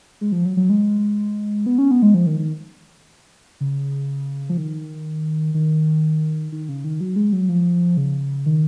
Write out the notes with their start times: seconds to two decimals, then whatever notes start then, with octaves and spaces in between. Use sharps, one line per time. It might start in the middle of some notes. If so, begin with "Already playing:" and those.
0.21 G#3
0.32 F3
0.45 F#3
0.57 F#3
0.70 G#3
1.66 B3
1.78 C#4
1.91 B3
2.02 G#3
2.14 F3
2.27 D#3
2.39 D#3
3.61 C#3
4.50 F3
4.57 D#3
5.54 D#3
6.52 D#3
6.69 C#3
6.84 D#3
7.01 F#3
7.16 G#3
7.33 F#3
7.49 F3
7.97 C#3
8.46 D#3